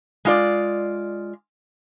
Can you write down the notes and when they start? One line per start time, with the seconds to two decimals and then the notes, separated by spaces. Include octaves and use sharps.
0.25 G#3 F4 D5